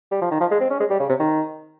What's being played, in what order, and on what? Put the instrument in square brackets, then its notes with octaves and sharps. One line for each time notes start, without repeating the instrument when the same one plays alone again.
[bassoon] G3
F3
D#3
F3
G#3
C4
C#4
G#3
G3
C#3
C3
D#3